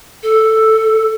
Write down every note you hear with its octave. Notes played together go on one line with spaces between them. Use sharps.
A4